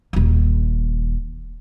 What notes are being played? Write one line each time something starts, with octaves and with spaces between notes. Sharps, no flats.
D#1 D#3